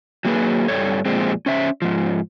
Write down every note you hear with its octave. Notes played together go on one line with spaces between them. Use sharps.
F#3 A#3 G#4 B4
G2 G3 A4 C#5
F2 A#2 G#3 C4
C#4 C5 E5
G#2 F3